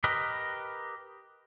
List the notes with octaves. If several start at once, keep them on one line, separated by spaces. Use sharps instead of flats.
G4 A#4 B4 D#5